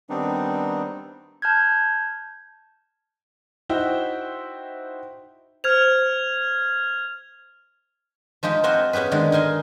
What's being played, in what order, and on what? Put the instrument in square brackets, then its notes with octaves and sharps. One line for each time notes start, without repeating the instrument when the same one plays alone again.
[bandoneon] D#3 G3 B3 C4 D4 D#4
[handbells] A5 F6 G6 G#6
[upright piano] D#4 E4 F#4 C5 E5 G5
[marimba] C5 [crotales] F6 G#6 F7
[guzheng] F3 G#3 D#4 G4
C4 F4 F#4 C5 D#5 G#5
B3 C#4 G4 G#4 B4
D3 D#3 G#3 G#4
D#4 A#4 G#5 C6